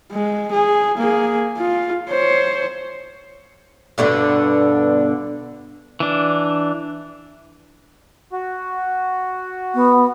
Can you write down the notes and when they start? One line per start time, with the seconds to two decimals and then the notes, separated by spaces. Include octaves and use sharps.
0.12 G#3
0.52 G#4
0.98 A#3 G#4
1.57 F4
2.09 C5 C#5
3.98 G2 B2 D3
6.00 E3 D4
8.33 F#4
9.75 B3